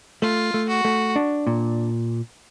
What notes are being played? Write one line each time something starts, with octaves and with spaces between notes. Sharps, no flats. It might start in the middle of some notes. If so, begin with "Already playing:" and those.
A3 F4
A3
F#4
A3
D4
A#2